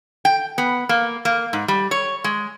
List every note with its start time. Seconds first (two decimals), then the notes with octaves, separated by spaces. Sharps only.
0.25 G5
0.58 B3
0.89 A#3
1.25 A#3
1.53 G#2
1.68 G3
1.91 C#5
2.24 G#3